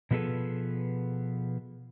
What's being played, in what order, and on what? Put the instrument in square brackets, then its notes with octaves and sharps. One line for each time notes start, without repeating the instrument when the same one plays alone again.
[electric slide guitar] B2 F3 B3 G#4 A4 B4